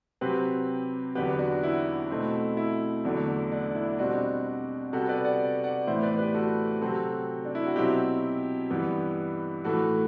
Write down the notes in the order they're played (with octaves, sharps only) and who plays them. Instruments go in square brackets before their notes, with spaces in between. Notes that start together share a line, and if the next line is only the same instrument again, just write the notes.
[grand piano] C3 F#3 C4 G4 B4
E2 D3 F#3 B3 G4 B4
D4 F#4
E4
B2 A3 C4
E4
E2 D3 F#3 A3
D4
E4
B2 G3 C4 D4 F#4
C3 G3 B3 F#4 A4
B4 D5
D5 F#5
D5 F#5
A2 E3 B3 C5 E5
B4 D5
G4 B4
F#4 A4
C3 F#3 C4 F#4 A4
D4
E4
F#4
B2 F#3 C4 E4 G4
G2 E3 B3
A2 E3 A3 F#4 A4